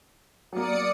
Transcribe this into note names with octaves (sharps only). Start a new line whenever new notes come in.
F#3 A#3 D5 D#6 C#7